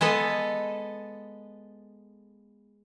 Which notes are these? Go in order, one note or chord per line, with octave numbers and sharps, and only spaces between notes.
G#3 B3 A4 D#5